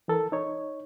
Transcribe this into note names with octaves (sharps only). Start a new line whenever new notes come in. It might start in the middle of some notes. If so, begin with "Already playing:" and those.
E3 A4 A#4
D#4 C#5